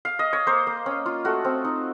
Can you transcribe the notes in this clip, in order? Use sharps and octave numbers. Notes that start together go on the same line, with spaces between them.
F5
D#5
C#5
A#3 C5
A#3
C#4
F4
A3 F#4
C4
D#4